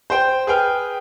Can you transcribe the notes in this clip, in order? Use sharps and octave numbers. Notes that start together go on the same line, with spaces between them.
C5 G5
G#4 B4 G5 F6